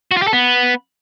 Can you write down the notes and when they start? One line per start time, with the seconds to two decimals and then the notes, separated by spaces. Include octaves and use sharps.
0.11 F#4
0.17 F4
0.22 G4
0.27 A4
0.33 B3